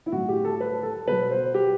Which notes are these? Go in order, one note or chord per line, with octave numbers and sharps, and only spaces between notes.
E4
A2 F#3 F#4
G4
A4
B4
A4
B2 F#3 B4
C5
G4